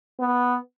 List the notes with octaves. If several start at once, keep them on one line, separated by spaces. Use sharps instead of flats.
B3